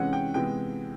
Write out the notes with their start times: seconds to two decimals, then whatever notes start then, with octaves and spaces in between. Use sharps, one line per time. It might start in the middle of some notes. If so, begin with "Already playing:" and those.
Already playing: C3 E3 G#3 C#4 F#5
0.13 G5
0.34 C3 E3 G#3 B3 G5